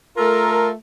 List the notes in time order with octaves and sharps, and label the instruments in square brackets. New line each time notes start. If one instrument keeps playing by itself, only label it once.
[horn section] A3 F4 A4 A#4